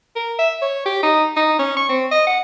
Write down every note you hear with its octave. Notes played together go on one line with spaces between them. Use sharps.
A#4
E5
C#5
G4
D#4
D#4
C#4
C#6
C4
D#5
F#5